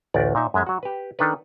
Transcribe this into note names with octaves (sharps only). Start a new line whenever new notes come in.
A1 D2 D5
A#2 D#4 E5
F#2 G#3 E5
F#3 F#4
G4 B4
D#3 D4 A4 B4